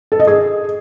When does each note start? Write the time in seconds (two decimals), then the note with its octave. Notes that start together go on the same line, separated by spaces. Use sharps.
0.12 A4
0.20 D#5
0.27 G#4